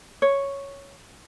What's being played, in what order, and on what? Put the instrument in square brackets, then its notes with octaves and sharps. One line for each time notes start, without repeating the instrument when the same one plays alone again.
[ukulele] C#5